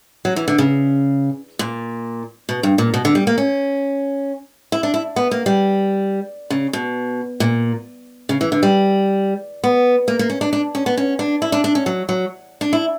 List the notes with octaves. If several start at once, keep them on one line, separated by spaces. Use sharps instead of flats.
F#3
E3
D3
C#3
A#2
B2
G2
A#2
B2
D3
G3
A#3
C#4
E4
D4
E4
B3
A#3
G3
C#3
B2
A#2
C#3
E3
D3
G3
B3
A#3
A#3
C#4
D4
D4
C#4
B3
C#4
D4
E4
D4
D4
C#4
F#3
F#3
D4
E4